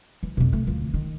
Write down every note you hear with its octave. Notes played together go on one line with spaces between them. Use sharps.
E3
F2 B2
A3
D2 F3
D#3